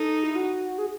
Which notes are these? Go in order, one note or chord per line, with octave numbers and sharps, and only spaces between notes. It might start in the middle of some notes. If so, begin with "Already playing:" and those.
Already playing: D#4 A4
E4
F#4
G#4